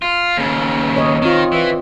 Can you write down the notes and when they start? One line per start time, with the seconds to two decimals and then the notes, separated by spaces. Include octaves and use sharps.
0.02 F4
0.37 D#2 C#3
0.96 C#5 D#5
1.22 D#3 C4 F4
1.52 E3